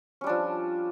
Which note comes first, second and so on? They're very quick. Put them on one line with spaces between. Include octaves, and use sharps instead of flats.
C#4 G3 D4 F3